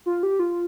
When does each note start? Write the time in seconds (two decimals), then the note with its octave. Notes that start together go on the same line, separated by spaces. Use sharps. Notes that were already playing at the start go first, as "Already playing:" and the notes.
0.06 F4
0.23 G4
0.39 F4